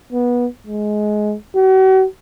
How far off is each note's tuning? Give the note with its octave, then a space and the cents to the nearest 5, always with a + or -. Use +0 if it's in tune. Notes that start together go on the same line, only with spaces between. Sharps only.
B3 -20
G#3 +20
F#4 +40